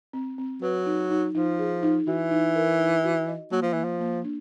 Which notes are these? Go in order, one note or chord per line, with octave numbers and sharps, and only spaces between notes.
C4
C4
F#3 B4
D#4
D#4
F3 D#4
G#4
D#4
E3 F#4
D#4
A#4
D#4
F#4
D#5
F#3 A#3
F3
E3 A#3
F3
A#3
D4